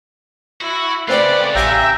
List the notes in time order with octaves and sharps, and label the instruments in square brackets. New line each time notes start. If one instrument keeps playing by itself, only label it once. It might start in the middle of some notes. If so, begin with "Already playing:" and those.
[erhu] E4 [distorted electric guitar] F#4
[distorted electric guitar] C#3 F4 [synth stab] A3 C4 G5 [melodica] B4 [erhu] D5
[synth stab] A1 F5 G#5 [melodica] G4 G5 A#5 [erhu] E5